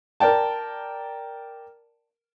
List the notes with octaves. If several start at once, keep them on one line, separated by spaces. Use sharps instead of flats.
A#4 D5 G5 A5